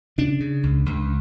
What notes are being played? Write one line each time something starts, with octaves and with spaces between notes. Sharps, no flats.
C#3 D4
C#3
C#2
C#2